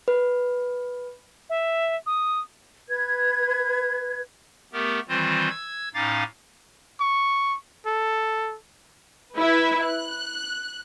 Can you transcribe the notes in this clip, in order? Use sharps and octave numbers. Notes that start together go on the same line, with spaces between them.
B4
E5
D#6
B4 G#6
A3 B3 G4 A#4
D#3 E3 G3 C4 F4 C5
E6 G#6
A2 C#4 D#4 F5 D6 A6
C#6
A4
E4 B4 E5
F#6